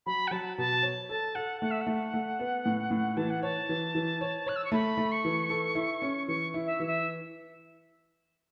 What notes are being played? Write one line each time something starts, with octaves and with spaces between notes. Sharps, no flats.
F#3 B5
F#5
F#3 A5
B2 A5
C#5
A4 A5
A4 F#5
A3 F#5
E5
F#5
A3
A3
B3
A2
A2
E3 A5
F#5
C#5 A5
E3
E3
C#5
C#5 F#6
E6
C#6
A3 B5
A3
C#6
E3
A4
E4
C#4
E3 C#6
E4
E5
E3
E5